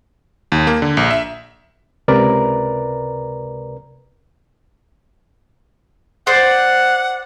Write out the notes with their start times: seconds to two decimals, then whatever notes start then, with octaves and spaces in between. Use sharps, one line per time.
0.52 D#2
0.67 A#3
0.82 D3
0.97 A#1
1.11 E5
2.08 C#2 C3 A#4 B4 D5 A#5
6.27 C5 D5 F#5